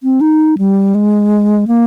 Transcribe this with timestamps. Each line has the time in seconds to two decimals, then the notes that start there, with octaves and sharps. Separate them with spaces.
0.03 C4
0.21 D#4
0.58 G3
0.95 G#3
1.68 A#3